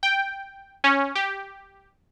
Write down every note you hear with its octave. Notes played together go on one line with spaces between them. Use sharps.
G5
C#4
G4